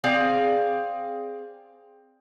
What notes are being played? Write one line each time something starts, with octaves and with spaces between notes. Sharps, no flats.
C4 G#4 D5 F5